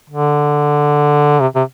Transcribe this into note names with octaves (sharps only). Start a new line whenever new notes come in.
D3
C3
C3